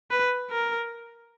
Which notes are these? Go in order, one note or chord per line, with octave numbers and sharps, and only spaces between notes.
B4
A#4